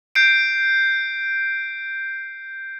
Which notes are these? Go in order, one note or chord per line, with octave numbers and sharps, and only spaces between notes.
G6 C7 D7